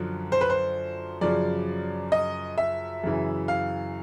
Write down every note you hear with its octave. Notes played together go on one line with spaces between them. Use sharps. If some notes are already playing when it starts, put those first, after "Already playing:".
Already playing: F#2 D3 F3
C5
B4
C5
F#2 C#3 F3 D5
D#5
E5
F#2 C#3 E3
F5